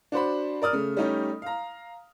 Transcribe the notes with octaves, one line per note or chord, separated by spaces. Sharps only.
D4 F#4 C5 B5
A#4 D5 D#6 F6
C#3 A3
G3 A3 C#4 D#4 G4
F5 A#5